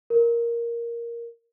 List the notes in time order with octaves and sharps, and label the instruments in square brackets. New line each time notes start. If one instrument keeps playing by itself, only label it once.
[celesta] A#4